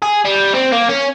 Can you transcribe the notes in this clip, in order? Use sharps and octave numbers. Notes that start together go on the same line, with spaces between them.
G#4
G3
C4
A#3
C#4